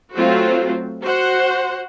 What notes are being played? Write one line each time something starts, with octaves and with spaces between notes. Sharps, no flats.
F#3 A3 C4 F4 F#4 C5
F#4 C5 F#5